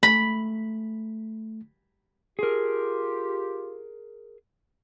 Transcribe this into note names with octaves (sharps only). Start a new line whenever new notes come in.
A3 B5
F4 G4 G#4 A#4